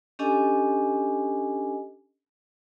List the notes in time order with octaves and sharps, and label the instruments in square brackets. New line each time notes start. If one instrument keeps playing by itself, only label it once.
[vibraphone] C#4 D4 G4 A4 D#5 G#5